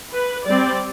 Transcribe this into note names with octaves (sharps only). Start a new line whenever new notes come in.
B4
G3 C4 D5